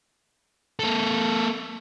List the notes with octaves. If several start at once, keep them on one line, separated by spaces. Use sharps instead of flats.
A#3 A4